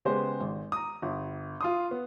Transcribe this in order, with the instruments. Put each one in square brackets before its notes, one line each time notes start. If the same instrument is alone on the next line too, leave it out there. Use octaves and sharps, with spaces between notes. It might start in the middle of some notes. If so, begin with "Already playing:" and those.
[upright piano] C#3 G#3 B3 G4 C5
G#1
A#5 D#6
G1
F4 C6 D#6
B3